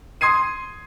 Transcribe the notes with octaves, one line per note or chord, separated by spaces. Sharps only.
C6 D#6 G#6 C7 D#7